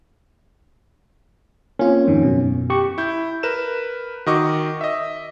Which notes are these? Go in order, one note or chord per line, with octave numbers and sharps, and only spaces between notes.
A#3 C4 C#4 F4
F2 G#2 D#3
F#2 B2
G4 C#6
E4 G6
A#4 B4 E7
D#3 F#4 D#5 C#6 D6
D#5 E5